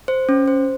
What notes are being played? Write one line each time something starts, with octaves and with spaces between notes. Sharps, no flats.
C5
C#4
C5